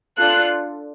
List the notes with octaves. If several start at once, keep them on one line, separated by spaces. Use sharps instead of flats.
D4 F4 A4 F#6